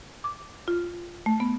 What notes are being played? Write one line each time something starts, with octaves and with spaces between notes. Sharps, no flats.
D6
F4
A3
B3